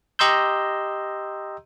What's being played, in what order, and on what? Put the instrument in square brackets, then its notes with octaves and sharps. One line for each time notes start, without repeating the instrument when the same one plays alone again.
[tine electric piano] G4 D#5 A#5 C6 E6 G6